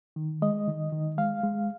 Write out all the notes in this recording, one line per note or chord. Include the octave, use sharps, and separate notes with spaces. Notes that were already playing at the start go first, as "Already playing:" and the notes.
D#3
G#3 D#5
D#3
D#3
G#3 F5
G#3